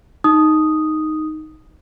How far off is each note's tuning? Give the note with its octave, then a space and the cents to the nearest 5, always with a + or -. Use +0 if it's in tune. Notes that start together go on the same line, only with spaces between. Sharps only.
D#4 +0 D#6 +0